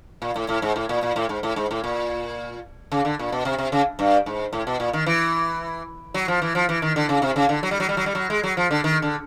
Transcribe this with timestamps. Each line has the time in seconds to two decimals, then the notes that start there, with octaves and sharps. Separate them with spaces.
0.22 A#2
0.36 A2
0.49 A2
0.62 G#2
0.76 A2
0.89 A#2
1.03 A#2
1.16 A2
1.29 G#2
1.43 A2
1.56 G#2
1.71 A2
1.84 A#2
2.92 C#3
3.05 D3
3.19 A#2
3.32 B2
3.45 C3
3.58 C3
3.72 C#3
3.99 G2
4.26 G#2
4.53 A2
4.67 B2
4.80 A#2
4.93 D#3
5.06 E3
6.14 F#3
6.28 F3
6.42 E3
6.55 F3
6.69 E3
6.82 D#3
6.96 D3
7.09 C#3
7.22 C3
7.36 C#3
7.49 D3
7.63 F#3
7.71 G3
7.80 F#3
7.89 G3
7.97 F#3
8.06 G3
8.15 F#3
8.30 G#3
8.44 F#3
8.57 F3
8.71 D3
8.84 D#3
9.02 D3